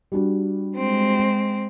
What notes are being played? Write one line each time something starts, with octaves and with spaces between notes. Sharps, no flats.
G3 D4 F#4
G#3 C4